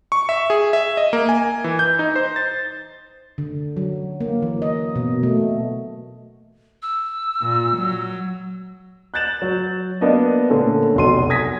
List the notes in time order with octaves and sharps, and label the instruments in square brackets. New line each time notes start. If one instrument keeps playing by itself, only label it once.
[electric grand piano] C#6
E5
G#4
E5
D#5
A#3
G#5
E3
G6
D#4
C5
A6
[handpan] D3
F#3
A#3
E3
D#5
B2
A3
[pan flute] E6
[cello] A#2
F#3
[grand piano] F#6 G6 A6 E7 F#7
F#3
A#3 B3 D4 D5 D#5
A#2 D3 A3 C#4
F1 B1 F#4 C6 D#7
G#5 D#6 G#6 A#6 B6